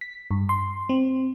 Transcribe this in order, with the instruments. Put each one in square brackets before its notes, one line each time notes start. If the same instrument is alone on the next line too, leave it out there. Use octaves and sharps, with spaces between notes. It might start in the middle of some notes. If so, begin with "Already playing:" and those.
[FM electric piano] B6
G2
C6
C4